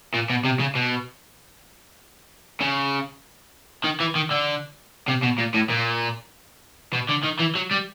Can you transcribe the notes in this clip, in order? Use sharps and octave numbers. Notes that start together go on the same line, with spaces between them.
A#2
B2
C3
C#3
B2
C#3
D#3
E3
D#3
D3
C3
B2
A#2
A2
A#2
B2
D3
D#3
E3
F#3
G3